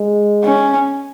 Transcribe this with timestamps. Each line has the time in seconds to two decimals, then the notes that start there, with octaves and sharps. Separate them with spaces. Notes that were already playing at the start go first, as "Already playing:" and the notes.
Already playing: G#3
0.44 C#4